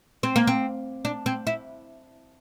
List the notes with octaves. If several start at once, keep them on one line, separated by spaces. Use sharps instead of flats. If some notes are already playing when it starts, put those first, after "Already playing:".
C4
A#3
C4
D4
C4
E4